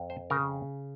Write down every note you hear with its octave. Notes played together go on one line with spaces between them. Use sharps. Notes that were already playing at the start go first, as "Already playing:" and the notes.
Already playing: F2
C5
C#3 A#4